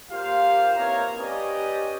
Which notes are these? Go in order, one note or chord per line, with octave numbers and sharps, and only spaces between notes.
A#3 F4 G4 C5 F5
E3 A#3 C4 D#4 C#5 A#5
C#4 G4 B4 D5 D#5